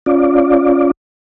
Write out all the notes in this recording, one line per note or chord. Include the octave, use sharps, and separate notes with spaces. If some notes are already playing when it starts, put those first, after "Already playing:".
C#4 F4 D5